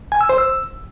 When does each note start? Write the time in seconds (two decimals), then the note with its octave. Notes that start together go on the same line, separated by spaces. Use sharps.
0.12 G#5
0.21 E6
0.29 C5
0.38 E6